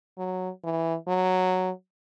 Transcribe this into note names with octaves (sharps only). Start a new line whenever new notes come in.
F#3
E3
F#3